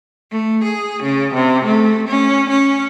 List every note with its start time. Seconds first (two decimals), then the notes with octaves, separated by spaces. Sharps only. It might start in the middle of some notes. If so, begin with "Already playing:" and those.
0.32 A3
0.64 G#4
1.03 C#3
1.33 C3
1.65 A3
2.08 C#4
2.49 C#4